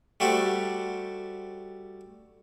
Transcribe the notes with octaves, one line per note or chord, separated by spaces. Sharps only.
G3 A3 F#4 G4 C5